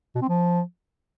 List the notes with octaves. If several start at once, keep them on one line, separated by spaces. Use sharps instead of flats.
B2
C4
F3